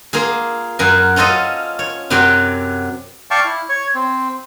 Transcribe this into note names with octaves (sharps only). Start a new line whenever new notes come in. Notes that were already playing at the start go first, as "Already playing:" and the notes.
A#3 F4 G#4
F#2 A#4 G#5
C#4 F4 A4 C5 D#5
C#5
F#2 C3 F#3 G4 G5 C6
D5 F5 G5 A5 C#6 D6
E4
C#5
C4